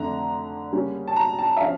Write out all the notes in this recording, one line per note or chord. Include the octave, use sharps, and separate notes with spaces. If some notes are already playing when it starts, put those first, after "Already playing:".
Already playing: F2 D3 A3 A#5
C#3 G3 A#3 C#4
A5
A#5
A5
E5
F3 C#4 F5